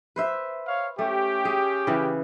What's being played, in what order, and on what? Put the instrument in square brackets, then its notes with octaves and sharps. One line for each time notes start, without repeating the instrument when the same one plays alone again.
[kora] B4 C5 E5
[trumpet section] C#5 F5
[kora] A3 [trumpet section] C#4 G4
[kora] G#4
C#3 E3